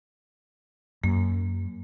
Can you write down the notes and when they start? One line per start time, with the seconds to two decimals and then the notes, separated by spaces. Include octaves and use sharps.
1.04 F#2 A#3